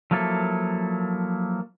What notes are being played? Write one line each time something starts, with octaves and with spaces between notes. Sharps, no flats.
F3 F#3 A#3 E4 A4